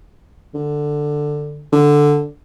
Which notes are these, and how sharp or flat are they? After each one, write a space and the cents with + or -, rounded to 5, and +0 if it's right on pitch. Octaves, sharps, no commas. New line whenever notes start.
D3 +10
D3 +0